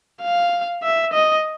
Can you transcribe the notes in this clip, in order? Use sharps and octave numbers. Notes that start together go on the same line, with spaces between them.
F5
E5
D#5